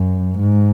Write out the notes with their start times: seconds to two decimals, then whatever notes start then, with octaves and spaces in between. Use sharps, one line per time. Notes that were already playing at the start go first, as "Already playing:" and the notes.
Already playing: F#2
0.38 G#2